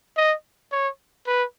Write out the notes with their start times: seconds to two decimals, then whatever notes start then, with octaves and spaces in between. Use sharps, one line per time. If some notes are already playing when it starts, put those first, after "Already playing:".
0.17 D#5
0.72 C#5
1.27 B4